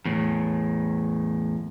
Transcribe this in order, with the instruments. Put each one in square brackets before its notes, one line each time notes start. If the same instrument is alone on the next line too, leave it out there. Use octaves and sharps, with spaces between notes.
[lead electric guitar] E2 A2